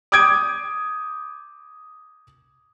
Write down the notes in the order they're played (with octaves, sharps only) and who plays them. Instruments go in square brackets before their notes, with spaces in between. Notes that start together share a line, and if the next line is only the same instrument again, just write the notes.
[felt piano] D6 D#6 G6 G#6 D7